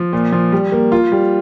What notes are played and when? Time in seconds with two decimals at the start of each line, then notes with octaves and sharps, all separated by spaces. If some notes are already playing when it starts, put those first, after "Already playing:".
Already playing: F3
0.13 A#2
0.32 F3
0.52 G3
0.72 A#3
0.92 F4
1.12 G3